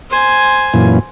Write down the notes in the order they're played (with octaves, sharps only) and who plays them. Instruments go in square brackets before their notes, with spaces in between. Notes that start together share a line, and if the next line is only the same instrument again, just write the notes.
[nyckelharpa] C5 G#5
[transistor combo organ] F#2 A#2 E3